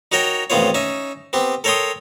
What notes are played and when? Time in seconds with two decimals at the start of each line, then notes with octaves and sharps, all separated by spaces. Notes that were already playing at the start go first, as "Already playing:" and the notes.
0.12 D#4 F#4 A#4 C#5 G5 A#5
0.50 A1 F2 D#3 B3 F4 C#5
0.74 C#4 D#4 E5
1.33 B3 C4 G4
1.64 A4 A#4 C#5 G5 C6 D#6